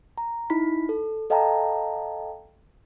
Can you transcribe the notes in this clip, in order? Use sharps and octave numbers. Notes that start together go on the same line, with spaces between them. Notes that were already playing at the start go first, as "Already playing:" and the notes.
A#5
D#4 E4 B5 B6
A4
A4 D#5 F5 G5 A5 A#5